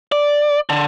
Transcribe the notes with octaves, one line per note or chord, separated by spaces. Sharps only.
D5
D3